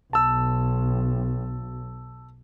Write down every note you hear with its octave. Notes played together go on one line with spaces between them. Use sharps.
B1 A5 E6